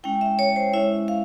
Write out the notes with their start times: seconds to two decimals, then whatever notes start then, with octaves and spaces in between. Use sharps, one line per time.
0.04 G#3 C#4 E4 G5
0.21 E5
0.39 C#5
0.56 C5
0.73 G#3 C#4 E4 E5
1.08 F5